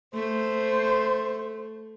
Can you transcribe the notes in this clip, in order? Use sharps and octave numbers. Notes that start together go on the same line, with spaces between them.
A3 C5